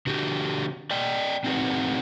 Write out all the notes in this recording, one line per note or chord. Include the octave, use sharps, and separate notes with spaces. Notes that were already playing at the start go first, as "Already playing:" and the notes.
D3 F#4 G4
D5 D#5 G5
C4 D#4 F#4 G#4 B4